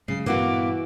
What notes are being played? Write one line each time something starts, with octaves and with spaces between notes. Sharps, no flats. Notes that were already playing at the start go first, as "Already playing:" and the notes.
C#3 F#3 G#3 C7
G2 A#2 E3 A#3 B3 F#4 D6